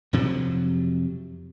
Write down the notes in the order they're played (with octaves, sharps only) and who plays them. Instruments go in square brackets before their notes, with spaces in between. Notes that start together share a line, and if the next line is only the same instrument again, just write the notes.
[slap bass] F2 C3 F3 F#3